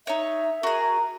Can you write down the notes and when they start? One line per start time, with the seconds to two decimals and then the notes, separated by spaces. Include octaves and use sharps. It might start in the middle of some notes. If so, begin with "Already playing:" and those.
0.07 D#4 C#5 E5
0.63 F#4 G#4 A#4